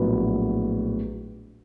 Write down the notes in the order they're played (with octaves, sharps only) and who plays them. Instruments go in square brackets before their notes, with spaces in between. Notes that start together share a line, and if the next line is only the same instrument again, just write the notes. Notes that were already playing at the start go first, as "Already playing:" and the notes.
Already playing: [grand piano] A#1 A2 F#3 B3